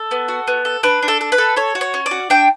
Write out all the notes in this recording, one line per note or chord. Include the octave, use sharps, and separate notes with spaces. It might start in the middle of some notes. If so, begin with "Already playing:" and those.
Already playing: A4
B3
F#4
B3
A4
D4 B4
D4
A4
A4
B4
A4
A4 C#5
F#4
C#5
C#4
D5
F#4
D4 G5